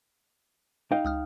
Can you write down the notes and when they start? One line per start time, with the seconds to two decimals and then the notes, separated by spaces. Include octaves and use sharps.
0.91 D#4 F5 G5
1.05 C#2 D#6 F6